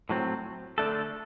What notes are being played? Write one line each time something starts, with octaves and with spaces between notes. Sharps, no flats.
A2 F#3 C4
D3 A3 D4 A4